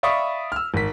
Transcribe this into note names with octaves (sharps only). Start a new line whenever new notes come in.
D5 E5 F5 B5 C#6 D#6
E6 F6
G#1 B6